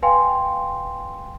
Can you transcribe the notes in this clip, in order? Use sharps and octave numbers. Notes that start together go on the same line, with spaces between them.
B4 F5 G5 G#5 C6